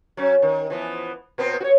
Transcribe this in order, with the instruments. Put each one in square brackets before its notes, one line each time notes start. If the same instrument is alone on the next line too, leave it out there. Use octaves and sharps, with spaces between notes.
[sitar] F#3 C#4
D#3
E3 F3 B3
A#2 B3 C4
F#4 C#5